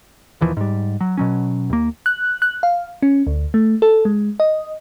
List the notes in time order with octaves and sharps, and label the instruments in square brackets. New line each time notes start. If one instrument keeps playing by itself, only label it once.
[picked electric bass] D#1 D#2 E3 F3
G#2 G3
F#3
B2 F#3 C#4
D#2 A#3
[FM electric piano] F#6
F#6
F5
C#4
D2
A3
A4
G#3
D#5